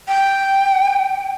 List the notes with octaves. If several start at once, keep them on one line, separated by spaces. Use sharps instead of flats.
G5